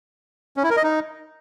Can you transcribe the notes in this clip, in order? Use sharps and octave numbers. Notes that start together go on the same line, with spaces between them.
C#4
E4
A#4
D#5
D#4